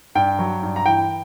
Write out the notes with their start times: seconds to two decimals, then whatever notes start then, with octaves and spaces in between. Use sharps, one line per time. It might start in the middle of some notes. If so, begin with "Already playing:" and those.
0.15 G2 G5
0.39 F#3
0.62 G2
0.76 A#5
0.86 E3 G5